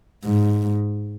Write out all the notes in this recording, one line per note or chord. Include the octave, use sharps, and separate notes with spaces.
G#2